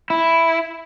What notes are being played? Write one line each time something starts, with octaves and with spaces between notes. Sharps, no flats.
E4